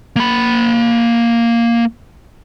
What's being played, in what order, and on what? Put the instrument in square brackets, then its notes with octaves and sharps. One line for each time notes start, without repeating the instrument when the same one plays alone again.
[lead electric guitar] A#3 B5